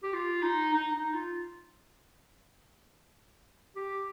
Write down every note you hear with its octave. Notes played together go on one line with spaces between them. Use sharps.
G4
F4
D#4
D#4
D#4
F4
G4